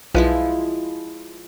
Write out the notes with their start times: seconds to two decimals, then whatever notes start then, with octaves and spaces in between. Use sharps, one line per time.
0.14 B1 F3 G#3 E4 B4